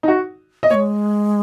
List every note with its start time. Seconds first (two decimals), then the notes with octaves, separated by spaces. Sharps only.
0.03 D#4
0.08 F#4
0.63 D#5
0.70 A#3 C#5
0.74 G#3